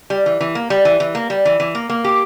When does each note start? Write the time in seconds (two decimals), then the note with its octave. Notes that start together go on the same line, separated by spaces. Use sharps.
0.10 G3
0.26 E3
0.40 E3
0.55 A#3
0.70 G3
0.85 E3
1.00 E3
1.15 A#3
1.30 G3
1.45 E3
1.60 E3
1.75 A#3
1.89 A#3
2.04 G4